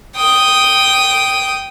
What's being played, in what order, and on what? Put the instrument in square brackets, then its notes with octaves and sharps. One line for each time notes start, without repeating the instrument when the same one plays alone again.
[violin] G5 D#6